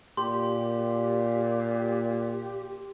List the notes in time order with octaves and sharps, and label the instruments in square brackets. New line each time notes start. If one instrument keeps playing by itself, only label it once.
[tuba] A#2 [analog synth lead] G4 [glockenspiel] C6